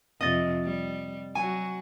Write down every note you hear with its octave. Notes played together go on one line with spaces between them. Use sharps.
F2 C3 F3 D#5 A6
G3
F#3 F#4 G#5